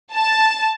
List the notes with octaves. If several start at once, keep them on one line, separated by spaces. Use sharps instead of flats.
A5